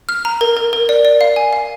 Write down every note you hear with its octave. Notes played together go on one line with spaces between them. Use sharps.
F6
A#5
A#4
A#4
A#4
D5
D5
F5
G#5
F5